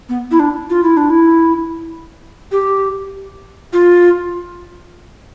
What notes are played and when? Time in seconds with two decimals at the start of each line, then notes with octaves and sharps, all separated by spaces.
0.09 B3
0.31 E4
0.39 D4
0.70 F4
0.83 E4
0.97 D4
1.10 E4
2.52 G4
3.73 F4